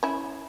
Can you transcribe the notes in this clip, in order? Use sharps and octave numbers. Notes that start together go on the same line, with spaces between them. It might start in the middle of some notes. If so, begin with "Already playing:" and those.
C#4 E4